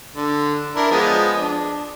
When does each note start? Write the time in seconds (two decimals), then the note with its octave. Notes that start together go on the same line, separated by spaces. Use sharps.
0.15 D3
0.76 D4 E4 A#4
0.91 F3 G#3 B3
1.37 D4